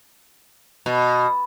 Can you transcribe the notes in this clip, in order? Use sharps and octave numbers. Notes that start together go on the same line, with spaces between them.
B2